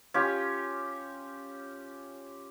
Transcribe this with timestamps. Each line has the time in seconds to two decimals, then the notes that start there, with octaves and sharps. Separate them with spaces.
0.14 C#4 F4 G4